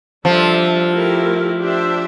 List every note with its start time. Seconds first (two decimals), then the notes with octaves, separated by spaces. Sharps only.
0.25 F3 G3 D4 A4 E5
0.92 A3 E4 G4 A#4
1.59 D4 G4 C5 E5